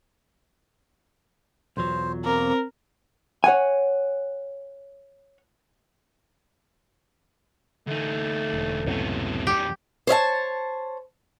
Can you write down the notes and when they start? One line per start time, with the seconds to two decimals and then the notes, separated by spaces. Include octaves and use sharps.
1.77 B1 E2 F#3 F4 C5
2.25 A#3 C4 A#4 C5
3.44 C#5 F#5 G#5
7.87 D2 A3 D#4
8.54 E1
8.87 C#2 F#2 A2 C3 B3
9.47 E2 G3 G4
10.07 C5 C#5 E5 A5